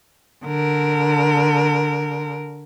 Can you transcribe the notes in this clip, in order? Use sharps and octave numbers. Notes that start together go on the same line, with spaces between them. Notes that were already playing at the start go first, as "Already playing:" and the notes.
D3 A#4